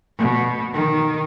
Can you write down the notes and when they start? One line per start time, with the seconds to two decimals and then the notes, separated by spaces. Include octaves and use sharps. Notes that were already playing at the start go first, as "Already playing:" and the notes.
0.19 B2
0.74 D#3